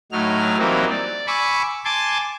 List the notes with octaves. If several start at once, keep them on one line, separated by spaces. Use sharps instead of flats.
A2 F#3 D#4 F6
E3 F#3 G3 A#3 C4 D#4
D5
G#5 B5 C#6 D6 E6
G#5 A5 C6 D6